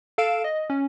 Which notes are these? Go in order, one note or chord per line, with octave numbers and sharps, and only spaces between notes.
A4 F5 D7 E7
D#5
C#4